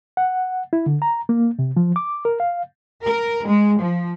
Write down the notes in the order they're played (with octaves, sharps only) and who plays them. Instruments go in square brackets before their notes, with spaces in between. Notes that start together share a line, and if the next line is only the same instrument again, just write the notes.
[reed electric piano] F#5
E4
D3
A#5
A#3
C3
F3
D6
A#4
F5
[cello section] A#4
G#3
F3